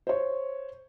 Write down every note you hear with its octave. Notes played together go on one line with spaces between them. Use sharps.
C5 C#5